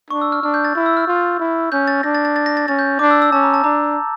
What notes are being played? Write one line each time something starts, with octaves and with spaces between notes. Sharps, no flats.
D4 C#6
E6
F6
D4 F6
G6
A6
E4
E6
F6
F4
E4
C#4 G6
A6
D4 A#6
A6
A6
A6
A#6
A6
C#4 A6
G6
D4 D6
E6
E6
C#4 A5
A#5
A5
D4 A#5